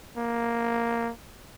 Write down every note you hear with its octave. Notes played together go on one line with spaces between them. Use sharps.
A#3